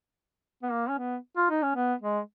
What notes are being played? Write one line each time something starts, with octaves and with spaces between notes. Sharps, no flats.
B3
A#3
C#4
B3
F4
D#4
C#4
B3
G#3